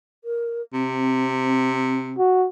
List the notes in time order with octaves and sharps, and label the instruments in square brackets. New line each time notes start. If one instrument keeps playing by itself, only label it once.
[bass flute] A#4
[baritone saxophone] C3 [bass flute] C4
[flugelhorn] F#4